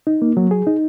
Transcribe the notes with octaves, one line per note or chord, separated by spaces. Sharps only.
D#4
A#3
F#3
G#4
D#4